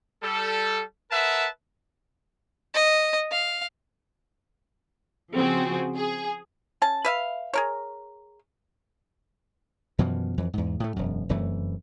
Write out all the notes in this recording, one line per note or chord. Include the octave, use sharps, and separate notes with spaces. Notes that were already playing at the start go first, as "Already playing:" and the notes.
G3 A4
A#4 B4 E5 F#5 A5
D#5
F5
C#3 F3 C4 F#4 G#4
G#4
C#4 A5
B4 E5 F5
G#4 A#4 C#5
F#2 B2 E3 F3
F2 E3
E2 G#2
A2 A3
E1 F#2
F1 F#2 E3 A3